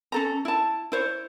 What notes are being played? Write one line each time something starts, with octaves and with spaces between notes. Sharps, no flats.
C#4 A4 A#5
E4 A5
E4 C5 C#5